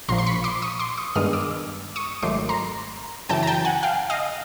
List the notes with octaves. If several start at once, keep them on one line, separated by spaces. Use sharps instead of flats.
A#1 A#2 F3 A#5 C6
C6
B5 C#6
C6 D6
C#6 D#6
C6 D6
C#6 D#6
G2 D#3 G#3 B3 D4 D#6 F6
D6 E6
C#6 D#6
G#1 G#2 D#3 F#3 A3 C6 D6
A#5 C6
F#2 C#3 E3 G5 A5
A#5
G5 A5
F#5 G#5
F5 G5
D#5 F5